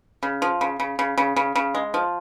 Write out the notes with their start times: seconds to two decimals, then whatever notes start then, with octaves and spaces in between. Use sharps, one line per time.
0.23 C#3
0.42 F3
0.61 C#3
0.80 C#3
0.99 C#3
1.18 C#3
1.36 C#3
1.56 C#3
1.75 G#3
1.94 F3